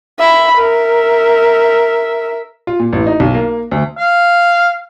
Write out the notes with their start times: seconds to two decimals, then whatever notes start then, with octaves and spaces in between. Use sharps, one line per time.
0.19 E5 B5
0.58 A#4 E5
2.67 F4
2.79 A#2
2.93 A1
3.07 D#4
3.20 B1
3.34 A#3
3.71 D2
3.98 F5